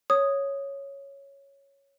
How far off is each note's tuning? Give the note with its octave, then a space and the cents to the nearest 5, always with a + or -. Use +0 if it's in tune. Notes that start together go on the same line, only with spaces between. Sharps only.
C#5 +0 D#6 +0